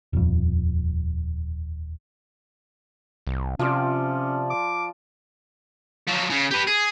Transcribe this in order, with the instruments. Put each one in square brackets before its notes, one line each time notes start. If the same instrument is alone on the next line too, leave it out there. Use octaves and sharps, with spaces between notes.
[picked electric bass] D#1 F2
[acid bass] C2
[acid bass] C3 [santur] F3 F4 D5 [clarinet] C#4
[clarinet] D6
[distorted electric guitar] F3 F#3
C#3
G4 B4
G#4